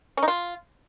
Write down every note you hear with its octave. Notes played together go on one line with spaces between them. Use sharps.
C#4
D#4
F4